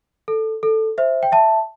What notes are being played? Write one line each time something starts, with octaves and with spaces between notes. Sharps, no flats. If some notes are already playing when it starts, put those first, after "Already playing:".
A4
A4
C5 E5
G5
E5 A5